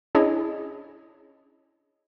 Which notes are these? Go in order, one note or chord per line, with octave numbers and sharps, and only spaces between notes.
C#4 D4 E4 G#4 C#5 D#5